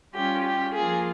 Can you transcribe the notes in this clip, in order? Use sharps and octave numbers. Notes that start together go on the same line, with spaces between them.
G3 C#4 F4 G4
G4
F3 A#3 F4 G#4